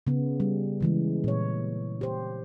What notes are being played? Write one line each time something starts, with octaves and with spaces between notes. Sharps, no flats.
C#3 B3
G3
C#3 E3 G#3
A#2 C#5
G4 C5